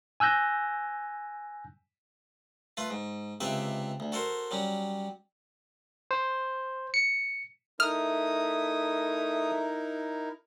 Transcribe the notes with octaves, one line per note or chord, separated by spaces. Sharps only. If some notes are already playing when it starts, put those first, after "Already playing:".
G#5 E6 F#6 G6 A#6
A3 F4 B4
G#2
C#2 C3 G4 B4 E5
D2
F#4 A4 A#4 C5
F#3 G3 C#4
C5
C#7
A3 D#4 E4 A#4 D#6 F6